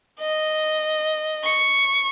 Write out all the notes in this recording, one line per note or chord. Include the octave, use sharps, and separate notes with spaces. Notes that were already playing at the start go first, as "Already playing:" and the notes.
D#5
C#6